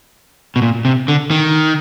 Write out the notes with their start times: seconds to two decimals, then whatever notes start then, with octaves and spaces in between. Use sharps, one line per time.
0.56 B2
0.62 A#2
0.85 C3
1.08 D3
1.31 D#3